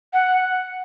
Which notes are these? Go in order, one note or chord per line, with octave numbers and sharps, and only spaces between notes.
F#5